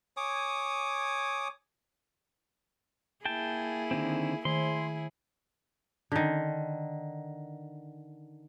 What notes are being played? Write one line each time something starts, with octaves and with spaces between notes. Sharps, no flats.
C#5 G#5 D6 D#6
A#3 E4 G#4 G5 A5
D3 D#3 C4
D#3 E4 G#4 C6
D3 D#3